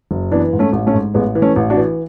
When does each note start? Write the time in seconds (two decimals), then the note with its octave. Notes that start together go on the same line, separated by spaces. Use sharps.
0.11 F#1
0.31 E3 B3 D4
0.53 G#2
0.59 A3 C#4
0.73 A1
0.87 A3 C#4
0.94 G#2
1.14 A1 G#3 B3
1.35 E3
1.42 A3 C#4
1.56 A1
1.70 D4 F#4
1.77 E3